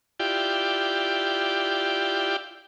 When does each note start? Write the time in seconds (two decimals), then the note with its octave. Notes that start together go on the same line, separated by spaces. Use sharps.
0.20 E4 F4 G4 D5 G5